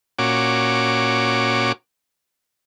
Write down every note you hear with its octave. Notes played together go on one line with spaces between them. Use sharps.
A#2 C#4 F#4 D6